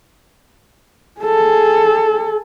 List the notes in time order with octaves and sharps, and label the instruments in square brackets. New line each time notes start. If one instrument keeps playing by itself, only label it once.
[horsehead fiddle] G#4 A4